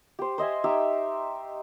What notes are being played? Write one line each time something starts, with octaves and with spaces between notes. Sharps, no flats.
G4 C5
C5 D#5 E5 G#5
D#4 G4 E5